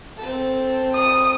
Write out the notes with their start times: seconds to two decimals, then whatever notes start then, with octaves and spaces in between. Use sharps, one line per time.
0.17 C4 A4
0.95 D#6